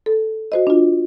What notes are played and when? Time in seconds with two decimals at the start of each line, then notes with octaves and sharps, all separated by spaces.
0.06 A4
0.52 F#4 C5 D#5
0.67 D4 F4